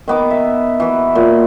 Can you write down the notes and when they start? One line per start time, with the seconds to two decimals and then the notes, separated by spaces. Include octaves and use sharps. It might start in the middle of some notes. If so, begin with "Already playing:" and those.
0.08 D#3 B3 D6
0.31 E5
0.80 E3 F#4
1.15 A#2